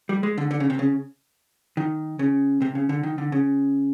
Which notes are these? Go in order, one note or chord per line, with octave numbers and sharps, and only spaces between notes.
G3
G#3
D3
D3
C#3
C3
C#3
D#3
C#3
C3
C#3
D3
D#3
D3
C#3